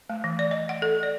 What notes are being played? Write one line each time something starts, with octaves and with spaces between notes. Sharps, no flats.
A3
E3
D5
D#5
F#5
A4
D5